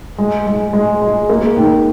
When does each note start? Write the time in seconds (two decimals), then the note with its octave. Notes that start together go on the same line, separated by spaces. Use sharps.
0.18 G#3
0.47 G#3
0.73 G#3
1.02 G#3
1.29 A#3
1.57 D#3